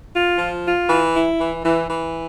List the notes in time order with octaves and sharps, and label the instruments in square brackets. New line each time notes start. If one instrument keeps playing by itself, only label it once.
[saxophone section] F4
F3
F4
E3
E4
E3
E3
E3